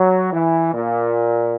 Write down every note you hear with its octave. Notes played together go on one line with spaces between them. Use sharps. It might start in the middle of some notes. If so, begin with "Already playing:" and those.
Already playing: F#3
E3
A#2